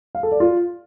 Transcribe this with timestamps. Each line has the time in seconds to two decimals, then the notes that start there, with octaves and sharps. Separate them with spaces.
0.15 F5
0.23 A4
0.32 D5
0.40 F4